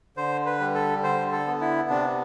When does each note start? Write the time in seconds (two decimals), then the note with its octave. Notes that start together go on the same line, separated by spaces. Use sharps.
0.17 D3 C5
0.46 B4
0.60 G3
0.75 A4
1.03 D3 C5
1.32 A4
1.47 B3
1.61 E4
1.90 C3 D4